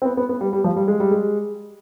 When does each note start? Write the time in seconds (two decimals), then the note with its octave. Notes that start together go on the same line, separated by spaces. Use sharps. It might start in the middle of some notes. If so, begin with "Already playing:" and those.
0.02 C4
0.05 B3
0.17 B3
0.29 B3
0.41 G3
0.53 G3
0.64 F3
0.76 G3
0.88 G#3
1.00 G3
1.11 G#3